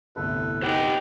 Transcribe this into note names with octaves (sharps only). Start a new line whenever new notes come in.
G1 C2 A2 A4 B4
D#4 G4 C5 F#5 G5